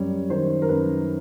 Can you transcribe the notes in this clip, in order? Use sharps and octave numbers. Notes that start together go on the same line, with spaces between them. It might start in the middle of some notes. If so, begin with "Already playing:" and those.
Already playing: F#2 G3 C#5
D#3 C5
A#4
F#2 B4